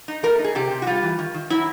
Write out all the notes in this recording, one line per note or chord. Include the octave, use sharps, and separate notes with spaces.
D#4
A3 A#4
D#4
G#4
C3 G4
C3
F#4
G3 F4
E3
D#3
D#3
F#3 E4